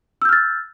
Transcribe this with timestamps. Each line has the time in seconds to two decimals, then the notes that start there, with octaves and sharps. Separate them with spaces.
0.22 E6
0.25 G6
0.29 F6
0.33 A6